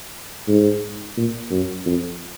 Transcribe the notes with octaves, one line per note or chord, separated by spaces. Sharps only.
G#2
A#2
F#2
F2